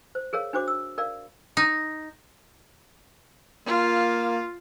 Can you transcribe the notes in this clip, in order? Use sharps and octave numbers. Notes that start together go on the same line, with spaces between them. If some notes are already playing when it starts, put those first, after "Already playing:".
C5
G#4 A#4 C#5 F5
D4 F#4 C5 D6
E6
A#4 D5 F5
D#4
A#3 F4